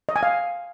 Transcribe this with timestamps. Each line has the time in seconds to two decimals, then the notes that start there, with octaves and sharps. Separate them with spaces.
0.09 D#5
0.16 G#5
0.23 F5